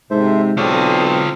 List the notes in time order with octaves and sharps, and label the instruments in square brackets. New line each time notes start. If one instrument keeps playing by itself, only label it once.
[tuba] G#2 [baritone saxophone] C3 [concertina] A4 C5 E5
[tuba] B1 [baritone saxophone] C4 [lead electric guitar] F4 C#5 [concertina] A4 D5 D#6